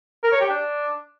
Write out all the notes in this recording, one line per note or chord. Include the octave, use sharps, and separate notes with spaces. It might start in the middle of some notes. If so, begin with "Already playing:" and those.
A#4
C#5
G4
D4